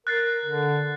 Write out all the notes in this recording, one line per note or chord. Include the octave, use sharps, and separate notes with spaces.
A#4 F#6 A6 C7
D3